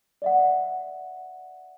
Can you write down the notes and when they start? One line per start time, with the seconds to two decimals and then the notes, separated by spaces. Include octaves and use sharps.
0.22 D5 E5 F#5